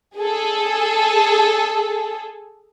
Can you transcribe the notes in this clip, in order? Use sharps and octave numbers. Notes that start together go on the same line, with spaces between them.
G#4 A4